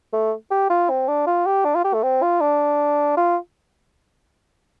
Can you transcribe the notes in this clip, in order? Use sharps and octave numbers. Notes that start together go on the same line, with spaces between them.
A3
G4
F4
C4
D4
F4
G4
D4
F4
G4
A3
C4
F4
D4
F4